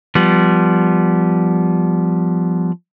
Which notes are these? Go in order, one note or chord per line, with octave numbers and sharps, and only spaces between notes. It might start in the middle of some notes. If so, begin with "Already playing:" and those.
F3 G3 B3